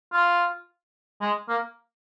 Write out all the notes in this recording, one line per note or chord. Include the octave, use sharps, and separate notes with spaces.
F4
G#3
A#3